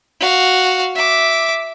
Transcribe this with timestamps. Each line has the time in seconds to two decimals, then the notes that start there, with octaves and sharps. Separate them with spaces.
0.20 F#4 F5
0.95 E5 D6